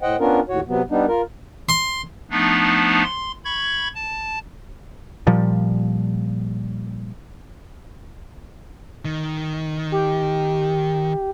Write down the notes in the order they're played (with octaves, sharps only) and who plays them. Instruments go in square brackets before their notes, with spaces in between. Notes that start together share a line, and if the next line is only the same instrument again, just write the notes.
[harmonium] A2 C5 D#5 F#5 G5
B3 C#4 D4 F4 A#4
D#2 A2 F#4 C#5
C3 F#3 B3
G3 B3 D4 D#4
F4 A#4
[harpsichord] C6
[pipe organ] F3 A3 B3 D4 D#4
C6
B5 C#6 G#6
A5
[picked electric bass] A#2 F3 G3
[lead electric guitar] D#3
[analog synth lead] G4